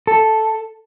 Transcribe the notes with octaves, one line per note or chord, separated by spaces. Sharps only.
A4